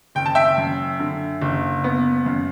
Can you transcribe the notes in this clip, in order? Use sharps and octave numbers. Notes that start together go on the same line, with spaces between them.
F#1 G5
A5
E5 G5
F#2
D3
F#1
B3
F#2